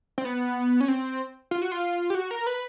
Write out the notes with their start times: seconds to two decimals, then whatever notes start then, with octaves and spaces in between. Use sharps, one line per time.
0.18 C4
0.25 B3
0.81 C#4
0.88 C4
1.51 F4
1.62 F#4
1.72 F4
2.10 G4
2.15 F#4
2.31 A#4
2.47 B4